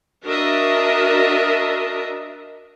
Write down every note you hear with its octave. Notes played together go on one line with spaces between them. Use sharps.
D4 F#4 A#4 D#5 E5